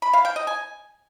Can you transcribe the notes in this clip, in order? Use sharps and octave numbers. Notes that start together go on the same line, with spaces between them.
B5
F5
G5
D#5
G#5